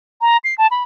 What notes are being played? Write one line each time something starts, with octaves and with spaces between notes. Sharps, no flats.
A#5
C7
A5
B5